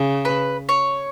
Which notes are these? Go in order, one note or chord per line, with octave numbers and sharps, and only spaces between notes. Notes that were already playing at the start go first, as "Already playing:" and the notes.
Already playing: C#3
B4
C#5